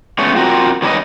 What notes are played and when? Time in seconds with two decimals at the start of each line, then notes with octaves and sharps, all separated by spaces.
0.19 G#3 A3 B3 C#4 C#5
0.36 C4 F4 F#4 A#4
0.82 D#3 G3 C#4 E4 B4 D#5